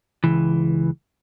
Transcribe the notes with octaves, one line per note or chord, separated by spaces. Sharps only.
C#2 E3